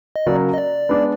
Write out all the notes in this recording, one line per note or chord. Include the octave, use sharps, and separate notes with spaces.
D#5
C#3 F#3 A#3 D5
D#5
D5
G#3 B3 D4